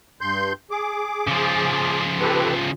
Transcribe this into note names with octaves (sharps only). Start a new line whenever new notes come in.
G2 C6 G6
G#4 D6
C#3 F3
G4 A4 B4